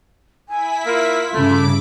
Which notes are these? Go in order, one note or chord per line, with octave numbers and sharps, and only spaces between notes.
E4 G#5 B6
A#3 F4
G2 C#3 A3 D6 D7